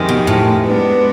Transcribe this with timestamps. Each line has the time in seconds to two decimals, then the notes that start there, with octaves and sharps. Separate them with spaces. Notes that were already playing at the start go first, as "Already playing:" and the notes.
Already playing: F2 C3 D#3 G#3
0.09 B2
0.27 A2
0.66 G#3 B3 D4